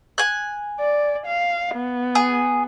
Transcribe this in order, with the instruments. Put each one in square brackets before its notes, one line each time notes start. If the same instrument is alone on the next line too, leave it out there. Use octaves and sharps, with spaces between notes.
[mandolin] G#5 F#6
[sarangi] D5
F5
B3
[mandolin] G#4